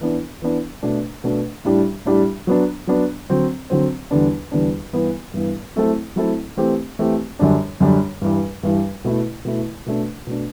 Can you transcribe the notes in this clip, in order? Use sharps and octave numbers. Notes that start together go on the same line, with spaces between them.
E3 B3 D4
E3 B3 D4
B2 A3 D4
B2 A3 D4
A2 G3 D4 G4
A2 G3 D4 G4
F#3 B3 D4
F#3 B3 D4
D3 F#3 C4
D3 F#3 C4
E2 D3 G3 B3 D4
E2 D3 G3 B3 D4
G2 E3 B3
G2 E3 B3
F#3 A3 C4 E4 A4
F#3 A3 C4 E4 A4
E3 A3 C4 G4
E3 A3 C4 G4
F#2 D3 G3 D4
F#2 D3 G3 D4
G2 E3 G3
G2 E3 G3
B2 A3 E4
B2 A3 E4
B2 A3 D4
B2 A3 D4